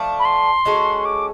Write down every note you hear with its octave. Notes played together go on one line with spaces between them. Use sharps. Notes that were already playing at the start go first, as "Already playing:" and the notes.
Already playing: F3 A3 D4
B5
C6
G#3 C#4 F#4 A4
D6